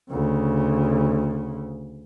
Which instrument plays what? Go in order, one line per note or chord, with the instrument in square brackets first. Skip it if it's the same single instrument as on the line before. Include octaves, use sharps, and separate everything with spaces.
[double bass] D2 C#3